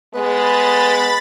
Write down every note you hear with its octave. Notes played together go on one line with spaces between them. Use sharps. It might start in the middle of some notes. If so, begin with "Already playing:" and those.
G#3 B3 B5 A6